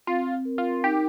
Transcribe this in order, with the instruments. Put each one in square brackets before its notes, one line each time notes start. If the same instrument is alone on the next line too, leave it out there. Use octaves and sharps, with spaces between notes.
[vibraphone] C4 [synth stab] F4
[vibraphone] A#4
[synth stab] F4
[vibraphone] D#4 [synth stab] G4